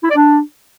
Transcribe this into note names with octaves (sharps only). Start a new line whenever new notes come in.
E4
D5
D4